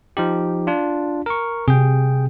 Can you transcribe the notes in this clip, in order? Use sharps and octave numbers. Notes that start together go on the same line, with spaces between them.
F3 D#4 G4
D4 F4
A#4 C#6
C3 G#4 G5